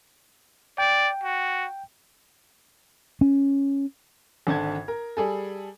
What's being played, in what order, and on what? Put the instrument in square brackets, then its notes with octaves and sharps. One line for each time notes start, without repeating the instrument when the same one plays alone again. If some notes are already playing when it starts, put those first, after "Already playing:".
[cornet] D5 [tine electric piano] G5
[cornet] F#4
[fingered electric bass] C#4
[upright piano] G#1 D3 A5 G#6
A#4
G3 G#4 A4